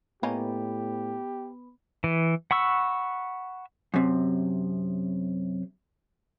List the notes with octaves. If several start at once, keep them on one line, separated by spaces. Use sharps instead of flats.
A2 A#3 B3 C#4 D#4 G4
E3
F#5 B5 C#6 E6
F#2 C3